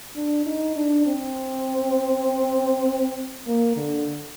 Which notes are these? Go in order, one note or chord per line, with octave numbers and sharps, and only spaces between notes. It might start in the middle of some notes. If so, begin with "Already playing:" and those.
D4
D#4
D4
C4
A#3
D3